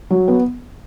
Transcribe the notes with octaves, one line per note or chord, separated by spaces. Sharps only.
F#3
B3